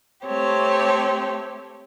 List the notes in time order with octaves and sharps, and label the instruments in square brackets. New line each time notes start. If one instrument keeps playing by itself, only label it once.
[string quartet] A3 C4 G4 C#5